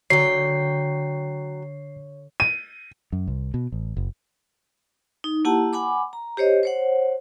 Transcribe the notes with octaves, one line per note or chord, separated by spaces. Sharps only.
D3 F#3 C#5 G5 C7
D#7
F#2
C2
B2
A1
F#1
D#4
A#3 E4 G4 F#5 A5
F#5 G#5 B5 D6
A#5
G4 C5 C#5 D#5
C5 C#5 F#5